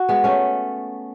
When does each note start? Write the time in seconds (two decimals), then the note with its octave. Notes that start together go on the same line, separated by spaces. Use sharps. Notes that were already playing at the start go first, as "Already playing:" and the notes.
Already playing: F#4
0.09 G#3 B3
0.24 A3 C#4